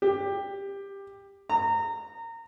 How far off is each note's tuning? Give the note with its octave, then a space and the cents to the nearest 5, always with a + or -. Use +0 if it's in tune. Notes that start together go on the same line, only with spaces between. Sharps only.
G4 +15
A#5 -25